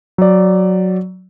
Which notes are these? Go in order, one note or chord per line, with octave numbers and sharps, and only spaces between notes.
F#3 D5